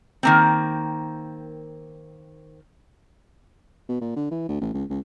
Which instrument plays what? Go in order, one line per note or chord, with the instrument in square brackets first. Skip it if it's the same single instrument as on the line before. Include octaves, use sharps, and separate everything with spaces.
[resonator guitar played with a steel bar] D#3 A#3 C4
[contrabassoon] B2
A#2
D3
E3
D2
A1
C#2
C#2